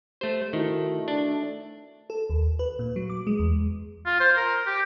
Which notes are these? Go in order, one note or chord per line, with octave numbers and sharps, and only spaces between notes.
A3 G4 C5
D#3 A3 D#4 E4 F#4
D4
A4
D#2
B4
A#2
F#3
D6
G#3
E2
F4
C5
A#4
G4